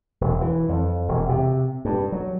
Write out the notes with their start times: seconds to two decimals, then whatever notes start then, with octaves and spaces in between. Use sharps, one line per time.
0.21 E1
0.41 E3
0.69 F2
1.08 E1
1.29 C3
1.85 G2
2.12 F#3